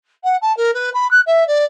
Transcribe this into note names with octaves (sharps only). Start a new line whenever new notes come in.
F#5
A5
A#4
B4
B5
F#6
E5
D5